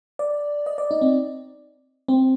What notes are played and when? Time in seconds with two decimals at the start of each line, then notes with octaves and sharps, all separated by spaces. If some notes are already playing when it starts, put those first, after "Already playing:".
0.19 D5
0.66 D#5
0.78 D5
0.91 D#4
1.01 C4
2.08 C4